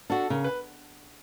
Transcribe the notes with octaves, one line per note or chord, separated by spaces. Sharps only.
D4 F#4 A4
C#3 A#4
B4